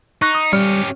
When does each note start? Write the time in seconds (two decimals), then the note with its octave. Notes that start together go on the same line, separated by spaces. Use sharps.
0.22 D#4 C#6 F#6 A#6
0.35 D#6
0.53 G3 C#4 G4 F6